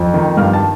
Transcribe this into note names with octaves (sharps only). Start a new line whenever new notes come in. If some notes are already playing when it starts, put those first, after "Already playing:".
Already playing: F2
D#3
G2 F5 F6
A5 A6